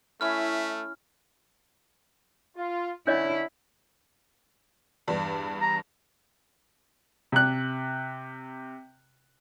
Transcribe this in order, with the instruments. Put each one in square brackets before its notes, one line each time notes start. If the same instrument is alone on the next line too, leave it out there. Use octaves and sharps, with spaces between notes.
[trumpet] A3 [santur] C#4 E4 [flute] E5 [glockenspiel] F6
[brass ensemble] F4
[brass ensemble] D3 C#4 [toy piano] D4 C#5 D#5 [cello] E4
[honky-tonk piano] E2 G2 D4
[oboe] A#5
[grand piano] C3 F#6